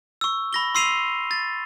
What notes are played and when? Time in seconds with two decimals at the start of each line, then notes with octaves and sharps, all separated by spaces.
0.21 C#6 E6
0.53 B5 A#6 G7
0.75 C6 E6 C7 D#7 F7
1.31 A6